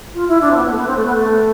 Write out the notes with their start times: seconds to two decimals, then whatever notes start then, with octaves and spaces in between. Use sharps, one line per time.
0.14 F4
0.28 E4
0.41 D4
0.51 C4
0.55 B3
0.66 B3
0.72 A3
0.77 B3
0.87 C4
0.97 A3
1.05 B3
1.15 A3